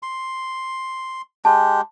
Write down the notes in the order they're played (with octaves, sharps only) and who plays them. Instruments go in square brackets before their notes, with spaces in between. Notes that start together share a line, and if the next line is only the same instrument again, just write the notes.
[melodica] C6
[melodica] G#3 G4 [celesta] A5